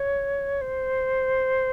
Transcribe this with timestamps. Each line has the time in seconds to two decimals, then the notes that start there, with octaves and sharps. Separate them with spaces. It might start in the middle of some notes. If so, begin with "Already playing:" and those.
Already playing: C#5
0.61 C5